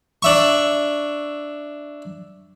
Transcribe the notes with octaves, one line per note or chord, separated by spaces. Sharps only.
D4 E5 C#6